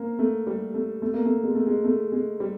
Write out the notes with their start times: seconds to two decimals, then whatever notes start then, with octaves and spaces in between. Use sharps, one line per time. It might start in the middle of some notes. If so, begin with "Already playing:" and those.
Already playing: A#3 C4
0.19 A3
0.47 G3
0.74 A3
1.02 A3
1.14 A#3
1.25 A3
1.44 G#3
1.55 A3
1.66 G#3
1.84 A3
2.12 G#3
2.40 G3